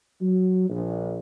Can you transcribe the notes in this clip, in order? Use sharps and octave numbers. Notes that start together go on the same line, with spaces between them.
F#3
A#1